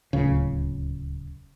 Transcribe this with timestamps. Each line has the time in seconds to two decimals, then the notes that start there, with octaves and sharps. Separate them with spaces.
0.13 D1 C#2 C#3